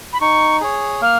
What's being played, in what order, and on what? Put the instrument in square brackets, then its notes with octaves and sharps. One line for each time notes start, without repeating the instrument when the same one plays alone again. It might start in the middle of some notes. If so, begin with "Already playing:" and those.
[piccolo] B5
[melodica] D#4 [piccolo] C#6
[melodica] G#4 C#5
[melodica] A#3 [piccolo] F6